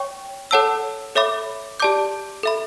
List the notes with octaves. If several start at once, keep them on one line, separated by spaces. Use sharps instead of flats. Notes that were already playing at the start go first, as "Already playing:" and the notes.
Already playing: C#5 G5 C#6
A4 C#5 F#5 A5 E6
A4 C#5 E5 B5 D6
G4 D5 A5 D6 G6
A4 E5 B5